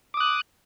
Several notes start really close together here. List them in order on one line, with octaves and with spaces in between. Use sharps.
D6 D#6 F#6